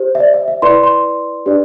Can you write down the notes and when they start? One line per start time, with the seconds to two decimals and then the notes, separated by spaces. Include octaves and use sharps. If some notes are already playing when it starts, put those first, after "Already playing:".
Already playing: G4 C5
0.15 E5
0.20 D5
0.34 E5
0.48 E5
0.62 E4 B4 D5 C6
0.83 C6
1.46 D4 G4 B4 D5